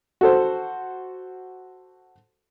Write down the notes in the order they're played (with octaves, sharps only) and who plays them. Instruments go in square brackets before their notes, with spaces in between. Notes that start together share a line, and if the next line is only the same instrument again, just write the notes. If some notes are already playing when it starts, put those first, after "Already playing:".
[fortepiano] F#4 A4 C5